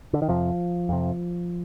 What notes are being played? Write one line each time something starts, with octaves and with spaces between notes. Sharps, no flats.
D3
D#3
F2 C3 F3
F2 C3